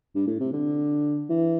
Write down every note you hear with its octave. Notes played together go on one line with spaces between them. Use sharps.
G2
A2
C3
D3
E3